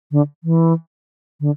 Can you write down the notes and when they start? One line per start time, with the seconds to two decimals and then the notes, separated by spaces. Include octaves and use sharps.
0.11 D3
0.44 E3
1.41 D3